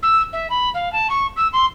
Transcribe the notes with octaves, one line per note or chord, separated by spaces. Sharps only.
E6
E5
B5
F5
A5
C#6
E6
C6